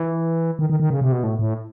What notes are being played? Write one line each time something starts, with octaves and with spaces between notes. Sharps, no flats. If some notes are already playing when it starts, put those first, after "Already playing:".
Already playing: E3
D#3
D#3
D#3
C#3
C3
B2
A2
A2